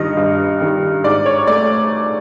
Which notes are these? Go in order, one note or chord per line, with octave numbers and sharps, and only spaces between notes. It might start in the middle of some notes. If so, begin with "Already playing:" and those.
Already playing: G2 D#3 G3 D#5
G2
D#3 G3
G#2 D5
C#5
A3 D5